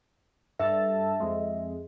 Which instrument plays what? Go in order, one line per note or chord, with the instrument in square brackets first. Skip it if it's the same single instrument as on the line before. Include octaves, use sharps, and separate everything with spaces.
[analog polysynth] G2 A4 A5 [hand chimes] E5
[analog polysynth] F2 G#3